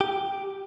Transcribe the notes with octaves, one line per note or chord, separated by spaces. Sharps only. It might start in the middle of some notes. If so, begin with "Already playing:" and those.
G4